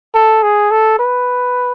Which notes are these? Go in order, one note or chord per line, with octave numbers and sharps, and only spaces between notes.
A4
G#4
A4
B4